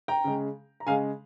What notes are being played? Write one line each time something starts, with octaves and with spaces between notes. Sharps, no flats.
G5 A#5
C#3 G#3
A#5
C#3 G#3 F5 G#5